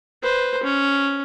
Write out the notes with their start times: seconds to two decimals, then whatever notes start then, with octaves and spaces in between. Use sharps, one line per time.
0.23 B4 C5
0.63 C#4